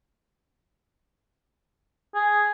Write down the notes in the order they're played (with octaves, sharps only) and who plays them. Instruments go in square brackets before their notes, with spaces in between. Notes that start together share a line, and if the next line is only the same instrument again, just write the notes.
[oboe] G#4